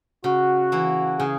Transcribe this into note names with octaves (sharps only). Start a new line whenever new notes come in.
C#3 F#4
E3 A#3
C#3 G#4